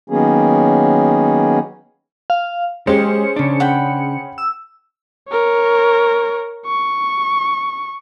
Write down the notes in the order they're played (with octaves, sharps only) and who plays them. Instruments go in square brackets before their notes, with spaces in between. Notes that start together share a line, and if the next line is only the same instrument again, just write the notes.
[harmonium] D#3 F#3 A#3 B3 C#4 G#4
[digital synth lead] F5
[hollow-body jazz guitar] G#3 G4 [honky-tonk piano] C#4 G#4 C5 [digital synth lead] C#7
[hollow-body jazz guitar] C#3 D4
[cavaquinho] F#5 G5 B5
[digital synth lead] E6
[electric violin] A#4 C#5
C#6